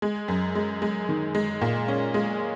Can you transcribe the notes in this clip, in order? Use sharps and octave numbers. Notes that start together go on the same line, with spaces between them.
G#3
F#2
G#3
G#3
D#3
G#3
A#2
C#4
G#3